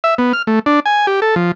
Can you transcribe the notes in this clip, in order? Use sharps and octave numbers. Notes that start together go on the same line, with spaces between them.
E5
B3
F6
A3
D4
G#5
G4
A4
F3